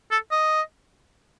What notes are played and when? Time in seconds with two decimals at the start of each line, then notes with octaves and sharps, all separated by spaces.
0.11 A4
0.31 D#5